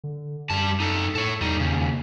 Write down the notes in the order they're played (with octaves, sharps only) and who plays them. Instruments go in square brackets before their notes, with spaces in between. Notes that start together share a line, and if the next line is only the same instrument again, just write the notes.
[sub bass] D3
[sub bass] F#2 [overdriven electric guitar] G3 A5
[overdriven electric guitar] D#4 A4
[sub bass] A2 [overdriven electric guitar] A4 C#5
[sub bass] E2 [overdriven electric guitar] G3 D#4
[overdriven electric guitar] D#2 C#3